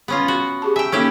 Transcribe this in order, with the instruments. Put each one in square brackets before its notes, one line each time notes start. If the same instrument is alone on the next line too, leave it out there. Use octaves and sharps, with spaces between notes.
[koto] B3 C#4 F4
F#4
[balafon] G4 G#4 A5
[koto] E5 G5 [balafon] G#5
[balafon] A#3 D#4 A4 [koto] C#4 E4 G4